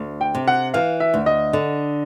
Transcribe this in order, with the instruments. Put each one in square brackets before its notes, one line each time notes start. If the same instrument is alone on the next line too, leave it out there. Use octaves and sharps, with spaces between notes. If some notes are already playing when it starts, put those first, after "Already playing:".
Already playing: [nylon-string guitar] D2
[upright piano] G5
[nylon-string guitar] C3
[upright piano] F#5
[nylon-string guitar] E3 [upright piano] F5
[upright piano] E5
[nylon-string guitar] D2
[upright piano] D#5
[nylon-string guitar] D3